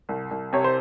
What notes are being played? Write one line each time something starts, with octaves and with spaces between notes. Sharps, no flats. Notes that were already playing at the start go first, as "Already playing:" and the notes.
C2
C2
C3 C#5
C5